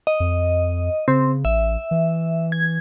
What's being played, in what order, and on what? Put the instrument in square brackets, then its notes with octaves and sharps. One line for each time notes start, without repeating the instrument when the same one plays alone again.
[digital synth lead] D#5
[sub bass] F2
[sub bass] C#3 [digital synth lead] C4
[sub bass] A1 [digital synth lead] E5
[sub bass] E3
[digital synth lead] G#6